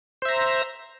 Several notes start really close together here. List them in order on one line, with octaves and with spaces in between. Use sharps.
C5 E5 A#5